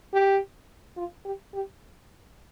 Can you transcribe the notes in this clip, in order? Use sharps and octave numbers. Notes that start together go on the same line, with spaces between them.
G4
F4
G4
G4